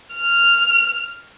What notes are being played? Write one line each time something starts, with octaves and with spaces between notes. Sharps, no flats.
F6